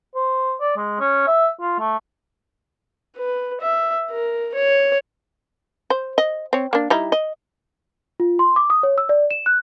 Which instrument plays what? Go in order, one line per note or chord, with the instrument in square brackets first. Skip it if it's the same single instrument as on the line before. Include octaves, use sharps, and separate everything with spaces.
[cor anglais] C5
D5
G#3
C#4
E5
F4
A3
[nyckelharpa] B4
E5
A#4
C#5
[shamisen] C5
D#5
C4 C#5
A#3 D4
G3 D#4 E4
D#5
[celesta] F4
C6
D6
D#6
C#5
E6
D5
E7
F#6